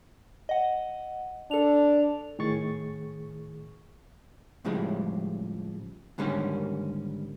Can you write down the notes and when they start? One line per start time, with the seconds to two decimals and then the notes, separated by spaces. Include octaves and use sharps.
0.49 D#5 F#5
1.51 D4 A4 F7
2.39 A2 D#3 G#4 C#6 A6
4.65 A2 C#3 F3 G3 G#3
6.18 G#2 D3 D#3 G3 A#3 C#4